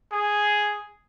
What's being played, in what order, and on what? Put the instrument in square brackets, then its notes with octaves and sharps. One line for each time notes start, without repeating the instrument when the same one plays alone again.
[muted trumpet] G#4